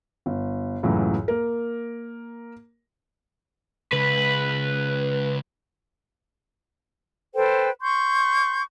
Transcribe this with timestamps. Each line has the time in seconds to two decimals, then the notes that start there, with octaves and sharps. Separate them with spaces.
0.26 G1
0.83 C#2 F#2 A2 E3 F#3
1.28 A#3 A#4
3.92 C#2 B4
7.35 A4 B4 C5 G5
7.81 C6 C#6 G6